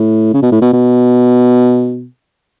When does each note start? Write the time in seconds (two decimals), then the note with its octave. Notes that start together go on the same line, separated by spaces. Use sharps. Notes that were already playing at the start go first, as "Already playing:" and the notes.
Already playing: A2
0.33 C#3
0.42 B2
0.52 A2
0.61 B2
0.73 B2